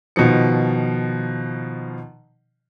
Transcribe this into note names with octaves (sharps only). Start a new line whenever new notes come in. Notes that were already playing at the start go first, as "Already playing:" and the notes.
B2 D#3 F3 C#7